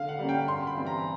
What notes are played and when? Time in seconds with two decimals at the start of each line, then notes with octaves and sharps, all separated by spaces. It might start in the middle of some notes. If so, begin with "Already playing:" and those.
Already playing: D3 F5
0.09 F#5
0.19 G3 A#3 C#4
0.29 G5
0.48 G2 C6
0.67 B5
0.77 E3 G3 C4
0.86 A#5